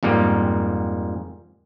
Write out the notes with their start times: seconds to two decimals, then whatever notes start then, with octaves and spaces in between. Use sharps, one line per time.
0.03 F2 G#2 G3 A#3